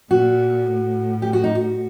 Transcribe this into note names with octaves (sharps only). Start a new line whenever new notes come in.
A#2 F#4
A2
G4
F#4
D#4
F#4